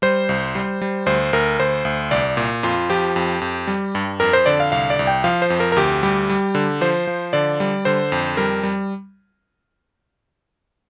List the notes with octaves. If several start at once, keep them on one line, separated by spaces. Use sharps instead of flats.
G3 C5
C2
G3
G3
D2 C5
D2 A#4
D2 C5
D2
C2 D5
A#2
F2 F4
F3 G4
F2
F2
G3
G2
F2 A#4
C5
D3 D5
F5
C2 F5
D5
C2
G5
F3 F5
C5
F2
A#4
A#4
D2 G4
G3 G4
G3
D3
F3 C5
F3
D3 D5
G3
D3 C5
F2
G3 A#4
G3